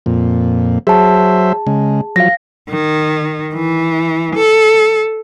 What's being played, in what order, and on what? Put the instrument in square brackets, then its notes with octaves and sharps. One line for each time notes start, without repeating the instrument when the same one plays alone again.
[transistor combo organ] F2 A#2
[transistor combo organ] F#3 C5 E5 [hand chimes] G#4 A5
[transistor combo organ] C#3 G#3
[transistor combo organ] F3 F#3 [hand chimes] F5 A#6
[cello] D#3
E3
A4